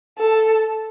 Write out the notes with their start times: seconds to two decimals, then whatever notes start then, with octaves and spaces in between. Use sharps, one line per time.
0.19 A4